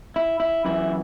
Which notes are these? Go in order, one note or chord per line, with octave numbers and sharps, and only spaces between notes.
E4
E4
F#2 E3 E4